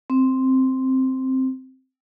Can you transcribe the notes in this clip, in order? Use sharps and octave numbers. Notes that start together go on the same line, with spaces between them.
C4